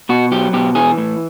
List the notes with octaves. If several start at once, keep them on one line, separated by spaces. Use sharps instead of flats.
B2 F#4
F#3 G4
B2 G4
E3 G#4
A2